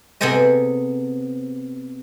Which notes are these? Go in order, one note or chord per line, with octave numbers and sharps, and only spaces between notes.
C3 B3 G#4 A4 C5 D#5